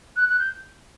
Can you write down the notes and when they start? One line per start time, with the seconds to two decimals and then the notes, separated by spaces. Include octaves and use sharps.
0.16 F#6
0.29 F#6
0.40 G6